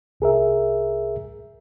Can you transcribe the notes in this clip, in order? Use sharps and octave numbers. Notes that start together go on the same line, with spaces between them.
C2 G#4 A#4 E5